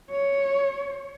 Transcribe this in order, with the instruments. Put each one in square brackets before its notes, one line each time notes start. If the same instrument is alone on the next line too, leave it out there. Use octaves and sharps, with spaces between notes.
[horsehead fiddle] C#5